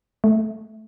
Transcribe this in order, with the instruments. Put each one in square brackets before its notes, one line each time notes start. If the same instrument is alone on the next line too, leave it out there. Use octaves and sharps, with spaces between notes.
[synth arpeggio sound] A3